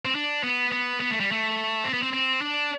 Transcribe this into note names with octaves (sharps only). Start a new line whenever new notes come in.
C4
D4
B3
B3
B3
A3
G3
A3
C4
B3
C4
C4
D4